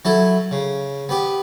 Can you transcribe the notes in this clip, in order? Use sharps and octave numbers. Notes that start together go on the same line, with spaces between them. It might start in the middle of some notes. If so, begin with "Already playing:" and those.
F#3 E4 A4
C#3
B3 G4